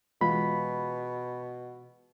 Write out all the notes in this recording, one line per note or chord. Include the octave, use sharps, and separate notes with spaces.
B2 E3 G#3 F4 B5